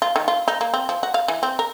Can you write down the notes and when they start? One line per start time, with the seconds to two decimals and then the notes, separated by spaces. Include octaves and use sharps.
0.02 F4
0.16 D#3
0.28 F4
0.48 D#4
0.61 A#3
0.74 C4
0.89 F3
1.03 F#4
1.14 F5
1.28 E3
1.43 C4
1.59 A#4